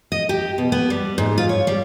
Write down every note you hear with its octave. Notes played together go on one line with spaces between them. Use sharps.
D#5
G4
B2
B3
G3
G#2
F4
C#5
G3